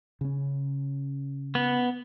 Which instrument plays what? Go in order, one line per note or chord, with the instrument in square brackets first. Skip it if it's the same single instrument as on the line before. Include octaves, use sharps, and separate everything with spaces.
[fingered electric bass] C#3 C#4
[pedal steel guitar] B3